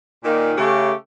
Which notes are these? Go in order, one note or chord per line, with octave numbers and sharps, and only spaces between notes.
A#2 D#3
C#3 A3 G4